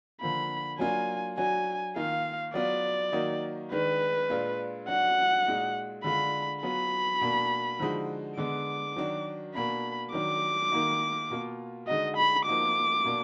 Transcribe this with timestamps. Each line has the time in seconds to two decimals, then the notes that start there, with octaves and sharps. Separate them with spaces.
0.21 D3 F3 A#3 B5
0.79 F#3 A#3 D4 F4 G#5
1.38 F#3 D4 F#4 G#5
1.96 D#3 A#3 F4 F5
2.54 F#3 B3 F4 D5
3.12 D#3 F#3 A#3 D#4 F#4
3.71 D#3 G#3 D4 B4
4.30 A#2 G#3 D4 F4
4.88 F#3 D4 F#4 F#5
5.47 A#2 G#3 D#4 F#4
6.04 D3 G#3 D4 F4 B5
6.63 F#3 B3 F4 B5
7.21 B2 A#3 D4
7.79 D3 F3 G#3 D#4 F#4
8.37 D3 G#3 B3 D6
8.96 D#3 F#3 D4 F#4
9.54 B2 A#3 D4 B5
10.12 D#3 F#3 D4 D6
10.72 D#3 A#3 D#4 F#4
11.30 B2 A#3 F4
11.87 D3 G#3 D#4 F#4 D#5
12.17 B5
12.46 F3 A#3 D#4 F#4 D6
13.05 B2 A#3 D4